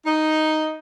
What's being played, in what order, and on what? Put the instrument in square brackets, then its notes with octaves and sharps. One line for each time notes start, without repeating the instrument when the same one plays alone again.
[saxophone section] D#4